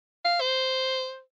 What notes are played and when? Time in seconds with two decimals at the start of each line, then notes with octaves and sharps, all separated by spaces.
0.25 F5
0.41 C5